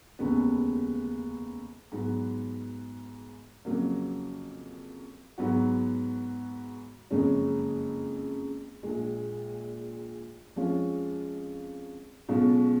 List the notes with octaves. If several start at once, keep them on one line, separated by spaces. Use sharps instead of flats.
F1 D#2 C#3 G#3 B3
G#2 F#3 B3
F2 C#3 F#3 A#3
G#2 F#3 B3 F#4
F#1 F2 C#3 G#3 C#4
A#1 A#2 G#3
F2 F3 G#3 C#4 F4
B1 B2 G#3 C#4 F4